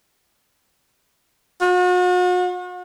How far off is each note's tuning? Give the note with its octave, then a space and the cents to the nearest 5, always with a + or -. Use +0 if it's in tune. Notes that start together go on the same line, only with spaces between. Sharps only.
F#4 -40